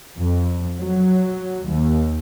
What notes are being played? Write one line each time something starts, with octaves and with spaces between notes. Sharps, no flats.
F2
F#3
D#2